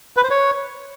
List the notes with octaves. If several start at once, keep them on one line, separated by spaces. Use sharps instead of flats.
B4
C5
C#5